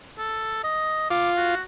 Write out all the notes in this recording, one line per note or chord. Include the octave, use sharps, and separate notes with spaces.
A4
D#5
F4 D6
F#4